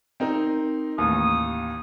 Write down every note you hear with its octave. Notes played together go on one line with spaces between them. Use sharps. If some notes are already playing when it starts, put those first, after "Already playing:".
C4 D#4 A#4
A1 D#2 D#6